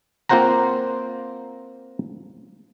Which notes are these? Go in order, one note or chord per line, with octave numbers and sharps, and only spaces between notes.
A#3 C4 F4 C5 F#5 A#5